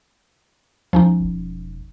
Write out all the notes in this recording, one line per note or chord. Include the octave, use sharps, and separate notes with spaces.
C#2 F3 C#4 D#4
E1